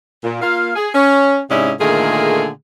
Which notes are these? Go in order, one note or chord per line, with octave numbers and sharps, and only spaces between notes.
A#2
A#3 F4 F5
G#4
C#4
G#2 C3 C#4 D4 E4 D#5
A#2 D3 D#3 A3 G#4